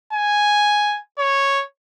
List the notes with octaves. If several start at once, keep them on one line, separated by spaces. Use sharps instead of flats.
G#5
C#5